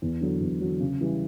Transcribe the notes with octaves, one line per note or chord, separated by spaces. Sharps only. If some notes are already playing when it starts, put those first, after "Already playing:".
E2
D3 F#3
E2
D3 F#3
C#3
E3 G3